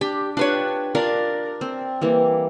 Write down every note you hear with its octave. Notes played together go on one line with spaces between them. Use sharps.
D4 G4
D4 F4 G4 B4 C#5
D4 F4 A#4 D5
C4
E3 G3 A#3